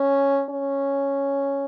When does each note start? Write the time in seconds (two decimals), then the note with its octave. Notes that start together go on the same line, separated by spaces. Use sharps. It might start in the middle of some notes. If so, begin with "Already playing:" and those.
Already playing: C#4
0.49 C#4